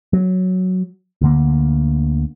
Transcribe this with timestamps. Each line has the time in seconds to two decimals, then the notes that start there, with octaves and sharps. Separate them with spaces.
0.13 F#3
1.22 D2 D3 A#3